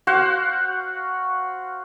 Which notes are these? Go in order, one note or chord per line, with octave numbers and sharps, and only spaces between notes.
F#4 C5 F5 F#5